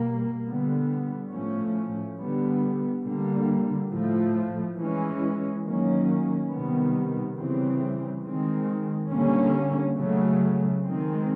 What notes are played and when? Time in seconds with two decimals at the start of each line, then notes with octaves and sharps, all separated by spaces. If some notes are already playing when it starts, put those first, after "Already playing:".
Already playing: B2 G3 A#3
0.44 D3 G3 B3
1.31 A2 F3 A3 C#4
2.17 D3 G3 B3
3.04 D3 G3 A#3
3.90 A2 F3 A3
4.76 E3 G#3 C#4
5.63 D#3 F#3 A#3 C#4
6.49 C3 D#3 G3 B3
7.36 C#3 E3 G3 C4
8.23 D#3 G#3 C4
9.09 D3 G3 A#3 C#4
9.95 C#3 F#3 A3
10.82 D#3 G#3 C4